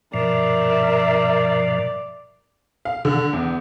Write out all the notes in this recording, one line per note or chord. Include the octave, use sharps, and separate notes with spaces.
G2 B2 F3 A#4 D5 E5
F5
D3
E2